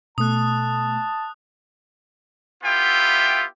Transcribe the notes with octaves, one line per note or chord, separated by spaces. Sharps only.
B2 A3 A5 D#6 F#6
B3 E4 F4 G4 E5 G5